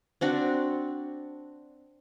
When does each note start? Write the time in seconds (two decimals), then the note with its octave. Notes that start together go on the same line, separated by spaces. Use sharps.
0.21 C4 D4 F#4